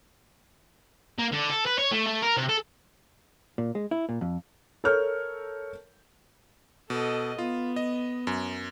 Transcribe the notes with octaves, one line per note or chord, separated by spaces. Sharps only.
A#3
D3
A4
B4
C#5
A3
A3
A#4
C3
A4
A#2
G#3
E4
A#2
F2
A4 A#4 C#5 F6 G6
B2 A4 D#5
B3 F4
D#5
F#2